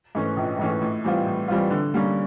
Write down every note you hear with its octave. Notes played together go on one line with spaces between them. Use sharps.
G#2 E3 A3 C#4
A#1
G#2 E3 A3 C#4
A2
E3 G3 C4 F4
A2
E3 G3 C4 F4
D3
G3 A#3 C#4